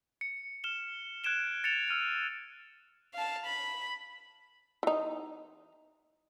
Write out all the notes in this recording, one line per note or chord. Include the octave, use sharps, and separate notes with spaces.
C#7
F6 E7 G7
F#6 G#6 D7 E7 G7
A6 C#7 E7 F7
E6 F6 D#7 F7
F5 A5
B5
E3 D#4